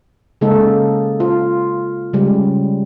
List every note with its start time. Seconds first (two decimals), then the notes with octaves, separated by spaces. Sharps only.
0.41 C#3 G#3 A#3 D#4 A4
1.20 F4
2.13 C#3 G3 G#3